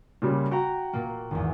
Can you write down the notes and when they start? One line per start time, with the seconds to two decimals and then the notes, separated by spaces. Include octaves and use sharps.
0.22 A#2 C#3 G3
0.51 F#4 G5 A#5
0.93 A#2 A#3
1.31 G#1 E2